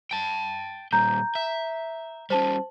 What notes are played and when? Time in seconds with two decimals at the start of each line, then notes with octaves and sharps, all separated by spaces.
0.11 G5 A5
0.92 A#2 G3 A#5 G6
1.35 E5
2.30 G3 C#4 C5 A5